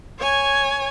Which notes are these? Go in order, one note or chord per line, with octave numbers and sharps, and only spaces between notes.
C#5 G#5